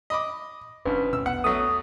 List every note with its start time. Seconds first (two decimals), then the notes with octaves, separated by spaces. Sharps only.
0.10 D#5 B5 D6
0.85 F1 C2 G2 C#4 D4 B4
1.13 D2 B2 C#4 E6
1.26 A#1 E2 B3 F#5
1.44 F#3 A3 D#6